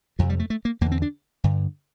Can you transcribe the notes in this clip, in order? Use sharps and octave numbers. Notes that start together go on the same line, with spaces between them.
F2 C3 F3
G3
A3
A3
A#3
E2 D3 A#3
C4
D4
G2 D3